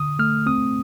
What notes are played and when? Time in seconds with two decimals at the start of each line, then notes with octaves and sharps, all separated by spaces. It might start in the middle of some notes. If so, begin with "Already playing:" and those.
Already playing: D3 D#6
0.19 A3 F6
0.46 C4 D#6